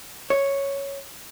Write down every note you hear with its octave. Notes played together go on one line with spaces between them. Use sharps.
C#5